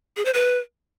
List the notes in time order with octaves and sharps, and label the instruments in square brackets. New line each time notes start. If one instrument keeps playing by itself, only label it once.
[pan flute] G#4
C5
B4